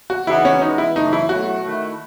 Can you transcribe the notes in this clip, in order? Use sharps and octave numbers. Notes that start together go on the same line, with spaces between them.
F#4
C#3 E3 B3 D#4 E4 F#4
C#4
E3 G#3 B3 D#4
E4
F#2 C#3 E3 A3 D#4
E4
B2 F#3 A3 E4 F#4
D#3 A3 E4